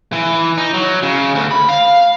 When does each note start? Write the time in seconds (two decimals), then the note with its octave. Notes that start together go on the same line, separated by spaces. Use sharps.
0.13 E3
0.58 D#4
0.74 F#3
1.03 C#3
1.35 D2
1.51 B5
1.69 F5